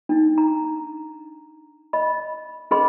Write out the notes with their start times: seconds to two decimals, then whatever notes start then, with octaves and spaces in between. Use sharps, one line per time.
0.09 D4 D#4
0.38 A#5
1.93 D#5 B5
2.71 C#4 G#4 B4 D#5 B5 C6